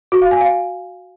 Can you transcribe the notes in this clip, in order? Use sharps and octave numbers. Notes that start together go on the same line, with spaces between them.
F#4
F5
G#5
F5